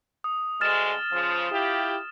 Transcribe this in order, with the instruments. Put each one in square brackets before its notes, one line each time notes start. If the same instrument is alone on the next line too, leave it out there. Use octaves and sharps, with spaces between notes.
[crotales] D#6
[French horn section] D2 G#3 [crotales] F6 A6 E7
[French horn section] C#3 F3
E4 F4 G4